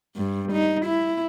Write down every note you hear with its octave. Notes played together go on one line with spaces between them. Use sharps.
G2
D#4
E4